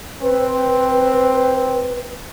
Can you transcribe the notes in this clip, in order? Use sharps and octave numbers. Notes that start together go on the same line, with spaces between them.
C4 B4